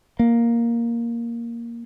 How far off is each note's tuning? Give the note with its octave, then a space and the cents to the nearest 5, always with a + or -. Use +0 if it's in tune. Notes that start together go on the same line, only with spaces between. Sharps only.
A#3 +5